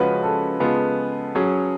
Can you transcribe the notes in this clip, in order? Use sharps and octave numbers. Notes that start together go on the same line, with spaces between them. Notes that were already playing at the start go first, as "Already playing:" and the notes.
Already playing: C#3 F3 G#3 C#4 F#4 B4
A4
C#3 G#3 B3 F4
F#3 C#4 G#4